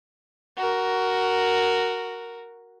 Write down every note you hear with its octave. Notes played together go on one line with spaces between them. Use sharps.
F#4 A#4